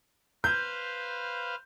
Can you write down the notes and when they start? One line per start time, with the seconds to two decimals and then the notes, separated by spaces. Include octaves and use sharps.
0.44 B4 C5 F5 G6